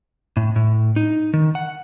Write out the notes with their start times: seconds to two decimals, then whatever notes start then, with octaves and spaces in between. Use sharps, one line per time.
0.37 A2
0.56 A2
0.96 D#4
1.34 D#3
1.55 F#5